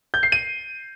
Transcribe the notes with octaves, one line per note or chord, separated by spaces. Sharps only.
G6
C7
D#7